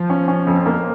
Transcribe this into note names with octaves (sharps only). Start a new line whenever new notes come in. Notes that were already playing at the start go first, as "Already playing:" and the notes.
Already playing: F3
C#4
C#4
F2
A#3